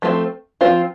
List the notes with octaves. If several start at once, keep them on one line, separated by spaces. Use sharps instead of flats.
F3 A3 C4 F4 C5
F3 A3 C4 F4 C5